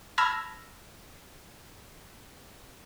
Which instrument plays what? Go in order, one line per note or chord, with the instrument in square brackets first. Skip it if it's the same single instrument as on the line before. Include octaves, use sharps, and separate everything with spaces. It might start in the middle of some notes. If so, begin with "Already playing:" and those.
[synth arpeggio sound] A5 B5 E6 F6 G#6 A#6